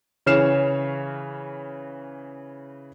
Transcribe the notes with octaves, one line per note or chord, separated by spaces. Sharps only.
C#3 E3 C#5 F6 C7 E7